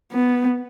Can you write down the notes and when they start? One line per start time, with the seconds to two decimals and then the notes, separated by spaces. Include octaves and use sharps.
0.12 B3